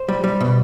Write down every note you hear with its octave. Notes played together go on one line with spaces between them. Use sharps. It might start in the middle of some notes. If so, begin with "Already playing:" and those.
Already playing: C5
G3
G3
B2